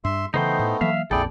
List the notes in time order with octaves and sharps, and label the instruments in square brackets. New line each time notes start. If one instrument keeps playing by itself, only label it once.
[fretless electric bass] G2 [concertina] E5 C6
[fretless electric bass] C#3 E3 [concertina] A3 B3 [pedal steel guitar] D#4 C5 G5
[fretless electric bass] A2
[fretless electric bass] E3 F#3 A#3 [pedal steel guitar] E5 F5
[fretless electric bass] A#1 F2 [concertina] E4 G#4 G5 [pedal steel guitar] A4 D5